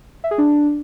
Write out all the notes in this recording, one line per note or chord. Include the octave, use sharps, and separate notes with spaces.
E5
G#4
D4